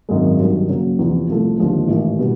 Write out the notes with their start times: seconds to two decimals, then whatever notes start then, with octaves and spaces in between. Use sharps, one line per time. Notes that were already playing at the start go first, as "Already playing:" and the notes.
0.09 G#1 F#2 D#3 G#3
0.39 G2 D#3 F#3
0.68 C#3 F#3 A#3
0.99 E2 C3 F3
1.29 C2 C3 F3 A3
1.58 D#2 D3 F3 G#3
1.88 A1 G#2 D#3
2.19 B2 G3 B3